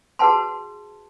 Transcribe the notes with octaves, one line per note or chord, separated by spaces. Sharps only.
F#4 G#4 B4 F#5 A5 C6